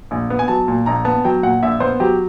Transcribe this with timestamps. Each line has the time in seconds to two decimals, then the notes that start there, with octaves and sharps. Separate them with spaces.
0.11 A#1
0.30 B3
0.39 G#5
0.48 F#3 A5
0.68 A#2
0.86 A#1 A#5
1.05 B3 A5
1.25 F#3 G5
1.43 A#2 F#5
1.63 A#1 E5
1.80 B3 C5
2.00 F#3 G4